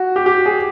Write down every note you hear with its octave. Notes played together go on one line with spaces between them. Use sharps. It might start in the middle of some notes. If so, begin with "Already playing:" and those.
Already playing: F#4
G4
G4
G#4